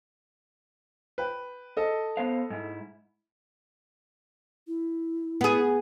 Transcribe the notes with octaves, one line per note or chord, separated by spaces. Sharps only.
B4 G5
A4 D#5
B3 C5 F5
G#2 E4
E4
B3 G#4